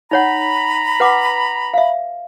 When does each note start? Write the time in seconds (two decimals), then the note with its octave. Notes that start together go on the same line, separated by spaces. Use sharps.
0.11 D#4 C#5 F#5 A#5 B5
1.00 B4 F#5 D6
1.74 E5 F5